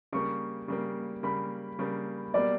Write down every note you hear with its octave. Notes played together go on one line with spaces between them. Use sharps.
C#3 G3 A#3 C#6
C#3 G3 A#3
C#3 G3 A#3 B5
C#3 G3 A#3
B2 G3 A#3 D5